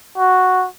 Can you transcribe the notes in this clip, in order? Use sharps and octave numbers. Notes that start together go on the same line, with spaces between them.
F#4